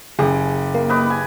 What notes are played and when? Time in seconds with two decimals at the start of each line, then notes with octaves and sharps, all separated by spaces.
0.19 F#1 G4 G#4
0.74 A#3
0.89 D#4 B4 D6
1.10 G#5